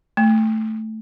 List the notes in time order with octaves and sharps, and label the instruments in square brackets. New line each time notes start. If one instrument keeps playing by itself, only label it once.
[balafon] A3